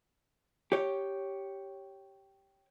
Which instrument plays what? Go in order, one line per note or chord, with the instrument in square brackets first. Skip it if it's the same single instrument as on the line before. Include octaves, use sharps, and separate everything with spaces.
[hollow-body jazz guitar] G4 C#5